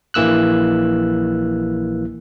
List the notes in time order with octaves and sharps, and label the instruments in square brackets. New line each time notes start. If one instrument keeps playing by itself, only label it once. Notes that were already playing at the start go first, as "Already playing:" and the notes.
[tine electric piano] A#1 E3 A#3 E6 F#6